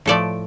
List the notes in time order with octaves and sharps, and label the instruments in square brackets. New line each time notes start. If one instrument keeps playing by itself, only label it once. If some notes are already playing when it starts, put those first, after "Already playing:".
[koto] A2 F3 A3 A4 D5